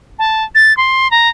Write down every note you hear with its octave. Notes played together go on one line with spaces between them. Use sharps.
A5
A6
C6
A#5